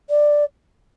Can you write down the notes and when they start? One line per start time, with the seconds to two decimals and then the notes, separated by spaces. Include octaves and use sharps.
0.09 D5